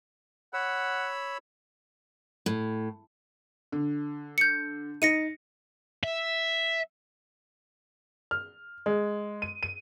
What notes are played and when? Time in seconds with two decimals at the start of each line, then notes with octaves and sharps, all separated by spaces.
0.54 C#5 F#5 B5 E6
2.46 A2
3.72 D3
4.38 G6 C#7
5.02 D#4 A#6 C#7 D#7
6.03 E5
8.31 F6
8.86 G#3
9.42 D#7
9.63 D#7